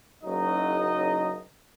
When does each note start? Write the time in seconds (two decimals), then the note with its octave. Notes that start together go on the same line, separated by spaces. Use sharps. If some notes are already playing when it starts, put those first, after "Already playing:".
0.24 F#1 F#3 D#4 D#5